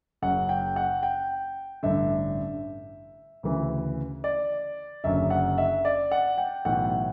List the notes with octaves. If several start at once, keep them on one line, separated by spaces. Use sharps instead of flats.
F#1 F#2 C#3 F#5
G5
F#5
G5
A1 G2 D3 E5
D2 C#3 E3
D5
F#1 F#2 D3 E5
F#5
E5
D5
F#5
G5
B1 A2 E3 F#5